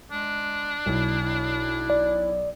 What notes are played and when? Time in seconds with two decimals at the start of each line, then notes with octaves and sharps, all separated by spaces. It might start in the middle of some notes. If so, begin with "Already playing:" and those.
0.11 G#3 D4
0.86 B1 E4
1.21 E4
1.90 D5